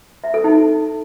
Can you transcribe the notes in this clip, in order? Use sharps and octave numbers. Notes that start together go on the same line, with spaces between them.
E5
A4
D#4